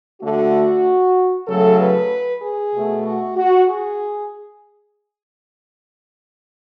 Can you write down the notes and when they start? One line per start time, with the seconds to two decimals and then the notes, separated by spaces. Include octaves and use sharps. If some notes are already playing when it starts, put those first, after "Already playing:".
0.21 D3 A3 F#4
1.47 C#3 F#3 A3 A4
1.79 B4
2.41 G#4
2.73 B2 A3
3.05 F#4
3.36 F#4
3.68 G#4